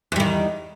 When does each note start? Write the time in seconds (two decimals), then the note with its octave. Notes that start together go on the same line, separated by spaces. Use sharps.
0.12 E2
0.16 G3
0.20 D#3